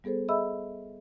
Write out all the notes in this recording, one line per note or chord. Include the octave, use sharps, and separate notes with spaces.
G3 B3 G#4 A4 C5
G#4 D#5 E5 B5 E6